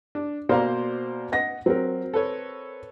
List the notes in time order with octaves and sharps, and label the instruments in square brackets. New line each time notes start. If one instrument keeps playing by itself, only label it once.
[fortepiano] D4
[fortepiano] B2 A#3 C5 [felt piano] D5 F5 A#5
[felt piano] D#5 F#5 A#6
[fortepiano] F#3 [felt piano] C4 A#4
[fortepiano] A4 B4 C#5